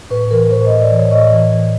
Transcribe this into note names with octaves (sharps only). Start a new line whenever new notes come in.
A2 B4
E3 A#4
A2 C5
A2 D#5
D5
E3
C#5
A2 D#5
E3
E3